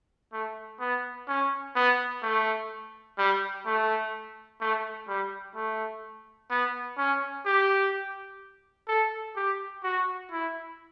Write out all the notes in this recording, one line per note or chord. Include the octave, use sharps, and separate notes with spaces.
A3
B3
C#4
B3
A3
G3
A3
A3
G3
A3
B3
C#4
G4
A4
G4
F#4
E4